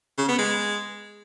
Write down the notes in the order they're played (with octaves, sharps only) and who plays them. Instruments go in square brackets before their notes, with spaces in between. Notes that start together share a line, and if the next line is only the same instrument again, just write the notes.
[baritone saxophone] C#3
B3
G#3